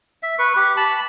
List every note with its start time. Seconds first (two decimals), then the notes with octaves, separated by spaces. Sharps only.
0.23 E5
0.39 B4 C#6
0.56 G4
0.77 A5 B5